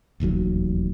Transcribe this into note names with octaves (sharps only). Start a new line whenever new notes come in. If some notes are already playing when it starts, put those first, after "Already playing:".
E1 A1 D#2 F#3